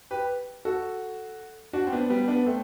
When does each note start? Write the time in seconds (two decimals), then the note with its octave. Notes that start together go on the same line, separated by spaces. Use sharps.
0.11 G4 B4
0.65 F#4 A4
1.73 D4 F#4
1.87 C4
1.93 B3 D4
2.10 G3 B3
2.28 B3 D4
2.46 A3 C4